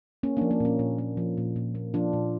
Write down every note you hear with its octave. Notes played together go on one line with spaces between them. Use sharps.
A#3 C#4
F3 A#3 D4
A#3
A#2 C#4
A#2
A#3
F3
A#2
A#2
A#3
F3 D4 F4
A#2